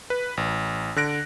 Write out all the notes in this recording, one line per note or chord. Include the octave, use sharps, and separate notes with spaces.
B4
A1
D3 F#6 A#6 D7